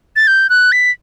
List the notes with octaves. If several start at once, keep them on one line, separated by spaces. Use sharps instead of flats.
A6
G6
F#6
B6